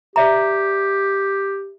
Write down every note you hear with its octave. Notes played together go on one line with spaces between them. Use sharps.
G4 D5 E5 A#5